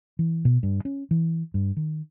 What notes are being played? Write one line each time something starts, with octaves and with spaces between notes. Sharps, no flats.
E3
B2
G2
C#4
E3
G2
D#3